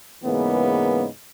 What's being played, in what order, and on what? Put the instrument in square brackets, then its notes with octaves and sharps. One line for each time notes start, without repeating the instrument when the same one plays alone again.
[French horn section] G#2 C#3 E3 A#3 B3